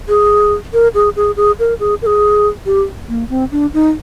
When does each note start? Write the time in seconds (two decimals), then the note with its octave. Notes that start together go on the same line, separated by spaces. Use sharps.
0.08 G#4
0.73 A#4
0.94 G#4
1.16 G#4
1.37 G#4
1.59 A#4
1.80 G#4
2.02 A#4
2.06 G#4
2.66 G4
3.09 A#3
3.30 C4
3.51 D4
3.74 D#4